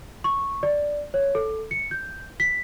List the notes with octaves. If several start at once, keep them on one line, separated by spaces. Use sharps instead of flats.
C#6
D5
C#5
A4
C#7
G6
B6